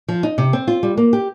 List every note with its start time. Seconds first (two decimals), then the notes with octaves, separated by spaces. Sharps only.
0.08 F3
0.23 D#4
0.38 C3
0.53 C4
0.68 F4
0.83 G3
0.97 A#3
1.13 G4